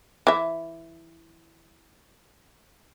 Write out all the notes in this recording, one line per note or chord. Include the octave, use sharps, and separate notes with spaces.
E3 E5